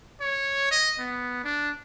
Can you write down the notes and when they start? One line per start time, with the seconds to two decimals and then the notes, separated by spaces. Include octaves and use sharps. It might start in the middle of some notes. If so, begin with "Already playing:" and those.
0.20 C#5
0.71 D#5
0.99 B3
1.44 D4